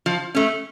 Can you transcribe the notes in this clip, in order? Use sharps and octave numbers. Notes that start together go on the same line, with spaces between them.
F3
A3 C#4